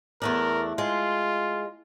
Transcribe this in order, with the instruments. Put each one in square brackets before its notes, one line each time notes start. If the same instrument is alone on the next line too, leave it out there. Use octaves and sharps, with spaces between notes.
[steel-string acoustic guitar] E2 A3 D4 [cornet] A#4
[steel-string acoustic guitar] G#3 [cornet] F4